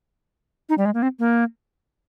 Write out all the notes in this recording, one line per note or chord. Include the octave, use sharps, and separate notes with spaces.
D#4
G3
G#3
A#3
C4
A#3